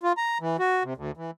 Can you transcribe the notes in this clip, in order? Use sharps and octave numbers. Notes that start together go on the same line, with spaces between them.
F4
A#5
E3
F#4
C3
D2
E3